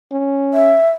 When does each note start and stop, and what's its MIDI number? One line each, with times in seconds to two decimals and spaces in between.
0.12 0.78 61
0.54 0.89 76